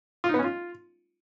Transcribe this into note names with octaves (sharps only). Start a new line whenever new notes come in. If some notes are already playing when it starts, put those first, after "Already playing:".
F4
D#4
B3
C#4
F4